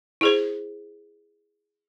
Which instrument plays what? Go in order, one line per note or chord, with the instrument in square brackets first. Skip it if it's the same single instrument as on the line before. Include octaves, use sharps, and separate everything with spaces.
[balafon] E4 G#4 C5